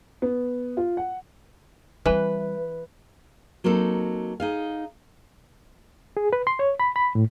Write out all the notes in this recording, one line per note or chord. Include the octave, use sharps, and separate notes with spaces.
B3
F4
F#5
E3 G3 C4 B4
F#3 A#3 C4 D#4 A4
D#4 G#4 F5
G#4
B4
C6
C#5
B5
B5
A2